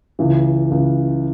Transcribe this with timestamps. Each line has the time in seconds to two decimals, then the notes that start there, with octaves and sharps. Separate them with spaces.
0.19 C#2 C#3 E3
0.71 C#2 C#3 E3